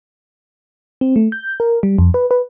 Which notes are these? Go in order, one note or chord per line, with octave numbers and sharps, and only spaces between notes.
C4
A3
G6
A#4
G3
F2
B4
B4